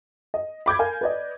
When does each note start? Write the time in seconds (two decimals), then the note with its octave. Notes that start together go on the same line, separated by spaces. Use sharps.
0.34 D#5
0.66 B5 D6 G6 G#6
0.79 A#4 F5 G#5
1.01 B4 D5 D#5